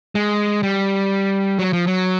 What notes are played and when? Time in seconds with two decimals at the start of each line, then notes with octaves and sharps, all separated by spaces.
0.15 G#3
0.63 G3
1.59 F#3
1.73 F3
1.87 F#3